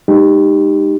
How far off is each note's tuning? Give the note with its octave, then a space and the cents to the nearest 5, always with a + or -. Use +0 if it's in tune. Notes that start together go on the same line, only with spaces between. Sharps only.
G#3 -35 D#4 -15 G4 +5